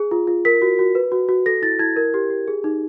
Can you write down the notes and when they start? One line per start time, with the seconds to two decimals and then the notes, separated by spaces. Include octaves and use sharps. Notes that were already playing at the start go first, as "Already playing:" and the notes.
Already playing: G#4
0.11 F4
0.27 F4
0.45 A#4 B6
0.62 F#4
0.79 F#4
0.95 B4
1.12 F#4
1.29 F#4
1.46 A4 A#6
1.62 E4 A6
1.79 E4 G#6
1.96 A#4 G#6
2.14 G4
2.30 G4
2.48 G#4
2.64 D#4